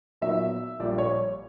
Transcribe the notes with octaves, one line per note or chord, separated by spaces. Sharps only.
A#2 F#3 B3 D#4 F#4 E5
A#1 A#2 G3 D5
C#5